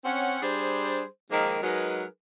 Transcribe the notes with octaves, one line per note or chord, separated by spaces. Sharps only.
C4 C#4 F#5
G3 D4 G#4 C5
D#3 F3 G#3 A#3 D#4 A#4
F#3 G#3 D#4 G#4 A#4 B4